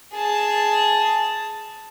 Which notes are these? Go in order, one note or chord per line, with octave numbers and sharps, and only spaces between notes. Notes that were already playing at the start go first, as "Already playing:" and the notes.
G#4 A5